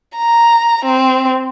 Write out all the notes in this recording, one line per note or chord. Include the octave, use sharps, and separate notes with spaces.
A#5
C4